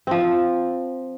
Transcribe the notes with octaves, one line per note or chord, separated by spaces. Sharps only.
F3 C4